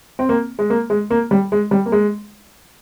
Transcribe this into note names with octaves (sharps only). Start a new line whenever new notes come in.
C4
A#3
G#3
A#3
G#3
A#3
G3
G#3
G3
A#3
G#3